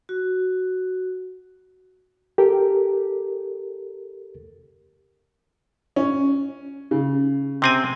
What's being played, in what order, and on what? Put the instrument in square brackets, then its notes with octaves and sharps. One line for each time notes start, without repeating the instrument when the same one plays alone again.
[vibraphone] F#4
[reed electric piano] G4 A4 A#4
[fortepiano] C#4
C#3
[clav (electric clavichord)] C3 C4 G#5